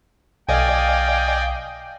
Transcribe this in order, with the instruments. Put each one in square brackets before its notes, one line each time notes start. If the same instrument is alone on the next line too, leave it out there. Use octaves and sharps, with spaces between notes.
[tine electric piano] B1 [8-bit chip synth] D5 D#5 G#5 [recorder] F5 [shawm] G5